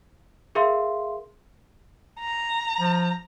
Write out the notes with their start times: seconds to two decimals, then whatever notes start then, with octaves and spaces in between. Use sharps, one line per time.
0.55 G#4 A#4 E5 F5 C6
2.20 A#5
2.80 F3